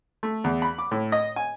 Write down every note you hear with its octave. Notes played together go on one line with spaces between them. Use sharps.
A3
E2
B5
D6
A2
D#5
G#5